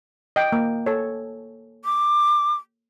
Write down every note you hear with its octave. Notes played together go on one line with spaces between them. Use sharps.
D#5 G5
A#3
A4 C#5
D6